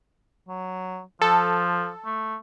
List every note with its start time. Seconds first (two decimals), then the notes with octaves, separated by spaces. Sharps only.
0.48 F#3
1.22 F3 A4
2.06 A3